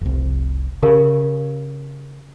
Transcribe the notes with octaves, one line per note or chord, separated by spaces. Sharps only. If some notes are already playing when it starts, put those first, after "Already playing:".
F1 C2
C#3 G4 A#4 F5